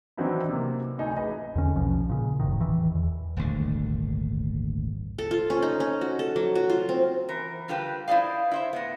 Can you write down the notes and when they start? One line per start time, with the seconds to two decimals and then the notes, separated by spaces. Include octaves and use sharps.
0.17 D#3 E3 F#3 C4 D4 E4
0.49 C3 A#3
0.98 D2 D#4 G#5
1.16 A1 G#4 B4 D#5
1.56 E2 D3 C#4
1.75 A#1 B2 F3 C#4
2.10 A#2 C#3
2.40 F1 A2 D#3
2.60 E1 D#3 E3
2.95 E2
3.37 D#1 G#1 D2 D3
5.18 A4
5.31 F4
5.50 C#4
5.62 D#4
5.80 C#4
6.01 F#4
6.19 A4
6.36 F#3
6.55 F#4
6.69 F4
6.89 C4
7.29 E3 A#4
7.68 D3 G3 F4 G4 B4 A5
8.08 E4 C5 D5 D#5 F5
8.51 E4 C5 E5
8.73 A2 B3